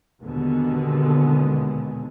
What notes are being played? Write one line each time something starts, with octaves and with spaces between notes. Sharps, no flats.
D#2 B2 D3 G#3 B3